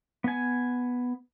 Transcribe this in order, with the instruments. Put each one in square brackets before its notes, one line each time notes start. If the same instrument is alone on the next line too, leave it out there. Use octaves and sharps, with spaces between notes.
[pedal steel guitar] B3 G#5